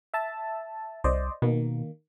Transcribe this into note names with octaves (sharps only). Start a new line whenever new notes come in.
E5 A5
C2 C5 D5 D#5
B2 D#3 A#3